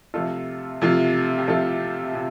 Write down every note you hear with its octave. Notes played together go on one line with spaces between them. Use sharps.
C3 F3 A3 F4 A4
C3 F3 A3 F4
G4
C3 F3 A3 F4 A4
C3